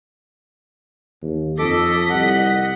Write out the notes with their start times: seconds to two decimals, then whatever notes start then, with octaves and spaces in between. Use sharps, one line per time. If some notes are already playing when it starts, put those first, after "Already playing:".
1.22 D#2
1.59 F2 A4 D#5 D6 B6
2.10 C2 F#5